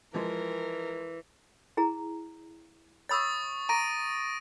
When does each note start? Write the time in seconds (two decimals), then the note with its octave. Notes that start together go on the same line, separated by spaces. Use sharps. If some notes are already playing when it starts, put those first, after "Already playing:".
0.14 E3 F3 G#3 A#4
1.77 E4 G#4 A#5
3.09 C#5 B5 C#6 D#6 E6 A6
3.69 A#5 D6 A#6 D7 D#7